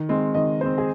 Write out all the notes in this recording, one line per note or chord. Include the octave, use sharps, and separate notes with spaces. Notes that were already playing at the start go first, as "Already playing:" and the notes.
Already playing: D#3
G#3 C4
D#3 D#5
G#3 C4 C5
G#4